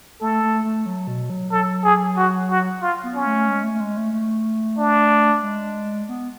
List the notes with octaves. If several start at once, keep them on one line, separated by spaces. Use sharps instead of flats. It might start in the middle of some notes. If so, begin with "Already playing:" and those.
A3 A4
A3
A3
F#3
B2
F#3
F#3 A4
G#4
F#4
F#4
F4
B3
C#4
A3
G#3
A3
A3
G#3
A3
A3
D4
G#3
B3